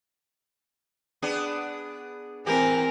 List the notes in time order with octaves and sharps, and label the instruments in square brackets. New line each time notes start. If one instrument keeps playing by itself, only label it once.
[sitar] B3 D4 G#4
[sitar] E3 E4 G4 [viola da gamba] C4 A#4 [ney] G#5